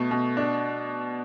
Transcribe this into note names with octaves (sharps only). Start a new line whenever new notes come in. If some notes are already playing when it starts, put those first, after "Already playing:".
Already playing: B2 A3
B2
D4